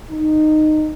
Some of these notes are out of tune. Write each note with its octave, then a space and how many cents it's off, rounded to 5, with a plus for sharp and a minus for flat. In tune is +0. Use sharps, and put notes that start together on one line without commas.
D#4 -15